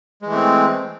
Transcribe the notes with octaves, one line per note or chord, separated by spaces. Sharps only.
E3 G#3 A3 C4